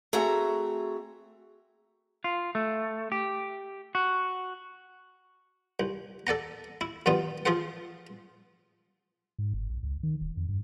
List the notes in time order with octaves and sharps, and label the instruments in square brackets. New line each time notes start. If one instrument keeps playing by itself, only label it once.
[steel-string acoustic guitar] A3 C4 F#4 G#4 E5 A#5
[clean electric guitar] F4
A3
G4
F#4
[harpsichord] C2
A4 D5 F#5 A#5
E4
G2 D#3 F#3 G3 B3 F4
F3 F4 G#4 C5 F#5
[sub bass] G#2
G1
A#1
C#2
D#3
D#1
F2
G2